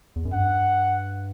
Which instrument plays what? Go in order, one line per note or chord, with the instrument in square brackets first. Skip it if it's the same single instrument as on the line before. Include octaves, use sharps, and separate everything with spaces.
[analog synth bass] E2
F#2
[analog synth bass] G2 [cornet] F#5